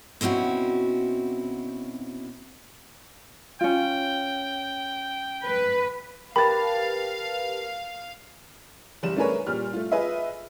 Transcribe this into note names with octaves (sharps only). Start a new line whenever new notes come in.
B2 C4 C#4 E4 F#4
C#4 F4 G5
B4
G4 A#4 B4 F5 A5 B5 A6
F#1 G3 E7
A3 D4 G#4 A#4 B4 C#5
A#2 G3 F6
A3 F4
F4 G#4 B4 D#5 E5